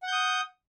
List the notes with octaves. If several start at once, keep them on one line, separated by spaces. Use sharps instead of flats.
F#5 D#6 G6